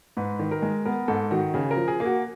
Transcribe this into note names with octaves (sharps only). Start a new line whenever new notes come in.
G#2 B4
D#3
A#4
G#3
B3 A#4
G#2 A4
D#3 F#4
C#3 G#4
A#4
F3
G#4
A#3
F#4